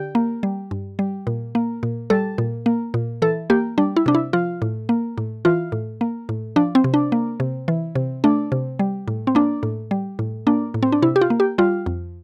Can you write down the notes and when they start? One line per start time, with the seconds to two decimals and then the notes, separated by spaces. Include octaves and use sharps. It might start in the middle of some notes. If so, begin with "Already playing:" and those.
Already playing: D3 G4
0.15 A#3
0.43 G3
0.71 G2
0.99 G3
1.27 A#2
1.55 A#3
1.83 A#2
2.10 G3 A4
2.38 A#2
2.66 A#3
2.94 A#2
3.22 E3 A4
3.50 A#3 G4
3.78 G3 D4
3.97 E4
4.06 C3 D4
4.15 E4
4.33 F3 F4
4.62 A2
4.89 A#3
5.18 A2
5.45 E3 F4
5.72 A2
6.01 A#3
6.29 A2
6.56 F3 D4
6.75 C4
6.84 C3
6.94 D4
7.12 A#3
7.40 C3
7.68 E3
7.95 C3
8.24 A3 D4
8.52 C3
8.79 G3
9.08 A2
9.27 C4
9.35 A#3 D4
9.63 A2
9.91 G3
10.19 A2
10.47 A#3 D4
10.74 A2
10.83 C4
10.92 D4
11.02 C3 E4
11.16 G4
11.21 F4
11.30 A#3
11.40 G4
11.58 G3 F4
11.86 F2